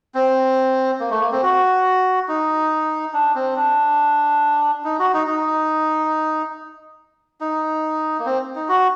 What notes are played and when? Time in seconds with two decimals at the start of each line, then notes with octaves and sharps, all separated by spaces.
0.14 C4
1.00 A#3
1.10 A3
1.20 A#3
1.32 C4
1.43 F#4
2.28 D#4
3.13 D4
3.35 C4
3.56 D4
4.84 D#4
4.99 F#4
5.13 D#4
5.27 D#4
7.40 D#4
8.19 A#3
8.26 C4
8.55 D#4
8.68 F#4